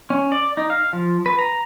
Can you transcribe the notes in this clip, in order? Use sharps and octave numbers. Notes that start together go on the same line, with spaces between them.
C#4
D5
D#4
F5
F3
B4
A#5